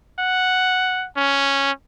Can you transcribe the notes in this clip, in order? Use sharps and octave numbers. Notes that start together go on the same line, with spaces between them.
F#5
C#4